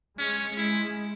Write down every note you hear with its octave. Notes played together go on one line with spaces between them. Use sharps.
G#3 C#4
G#3 E4